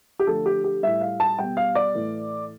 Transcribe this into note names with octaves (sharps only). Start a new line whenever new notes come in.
G4
D3 F3 A3 A4
G4
G4
A2 G3 E5
F5
A5
B2 G3 G5
F5
D5
A2 E3 A3